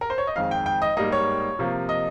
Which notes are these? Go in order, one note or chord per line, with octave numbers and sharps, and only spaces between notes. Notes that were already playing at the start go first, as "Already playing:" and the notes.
A#4
C5
C#5
D#5
F2 D#3 G#3 F5
G5
G5
D#5
G#2 G3 A#3 D#5
C#5
C3 F3 A#3
D#5